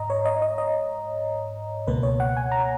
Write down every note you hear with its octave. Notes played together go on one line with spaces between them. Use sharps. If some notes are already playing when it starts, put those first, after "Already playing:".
Already playing: G#2 D#5 A#5
C#5
D#5
D#5
D#5
C#2 B2 A#3 B4
C#5
F#5
G#5
A#5